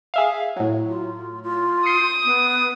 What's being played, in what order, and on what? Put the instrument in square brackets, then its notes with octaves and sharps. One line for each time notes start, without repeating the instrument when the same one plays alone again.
[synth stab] G#4 E5 F5
A2 F#3
[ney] F4
F4
[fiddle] D#6 [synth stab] G6 C7 C#7
[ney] B3